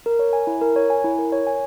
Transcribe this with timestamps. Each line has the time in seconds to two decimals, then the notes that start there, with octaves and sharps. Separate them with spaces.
0.06 A#4
0.19 C#5
0.33 G#5
0.47 E4
0.61 A#4
0.76 C#5
0.90 G#5
1.04 E4
1.19 A#4
1.32 C#5
1.47 G#5